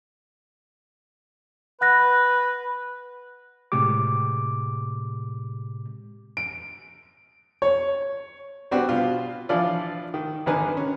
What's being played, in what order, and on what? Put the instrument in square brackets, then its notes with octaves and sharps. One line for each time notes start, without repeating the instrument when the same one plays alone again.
[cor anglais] B4 [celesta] F#5 F#6 A#6
[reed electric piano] A2 C3 G#3 G4 D6
[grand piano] D7
C#5
[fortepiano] G3 B3 C4 D4 F#4 G4
B2 F4
E3 F3 D4 E4 F4 D5
D#3
G#1 D3 A#4 B4 G#5
C#4